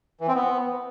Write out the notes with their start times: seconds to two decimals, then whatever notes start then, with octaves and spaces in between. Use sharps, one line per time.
0.21 E3
0.28 C4
0.35 B3